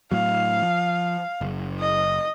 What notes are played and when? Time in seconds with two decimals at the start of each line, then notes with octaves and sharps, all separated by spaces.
0.12 A2 F#3 F5
0.62 F3
1.41 F#1
1.79 D#5